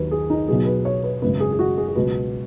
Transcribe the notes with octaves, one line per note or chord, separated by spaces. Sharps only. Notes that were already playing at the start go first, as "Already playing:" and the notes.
Already playing: D#2 D#3 F#3 B4
G#4
D#4
B1 B2 F#3 G#4
B4
C#5
B4
G#1 F#2 C#3 B4
G#4
G#4
F#4
G#4
G#4
C#2 B2 F#3 B4